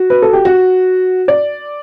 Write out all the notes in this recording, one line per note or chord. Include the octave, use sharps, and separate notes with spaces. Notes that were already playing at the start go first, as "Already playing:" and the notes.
Already playing: F#4
B4
A4
G4
F#4
D5